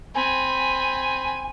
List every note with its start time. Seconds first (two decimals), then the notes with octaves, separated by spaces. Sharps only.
0.15 C4 G#5 B5